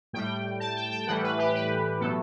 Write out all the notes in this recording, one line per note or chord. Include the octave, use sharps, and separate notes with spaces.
A2 G3 G5
A5
G5
G5
A2 E3 G3 F#5
B4
G4
B4
B2 F#3 A3 A4